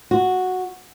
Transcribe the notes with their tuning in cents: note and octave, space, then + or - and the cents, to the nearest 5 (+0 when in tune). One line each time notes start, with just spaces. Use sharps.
F#4 -5